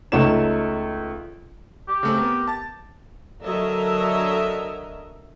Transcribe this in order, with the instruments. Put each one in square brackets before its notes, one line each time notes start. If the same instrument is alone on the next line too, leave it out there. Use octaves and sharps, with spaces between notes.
[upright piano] C#2 A3 D#4 C#5 E7
[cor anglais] G4
[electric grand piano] C#3 A3 C4
B3 A#4
A5 A6
[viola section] D3 F#3 A4 A#4 D#5 E5